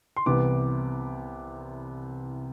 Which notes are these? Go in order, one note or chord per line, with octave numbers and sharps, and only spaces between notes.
C6
C2 C3 E3 B3 D6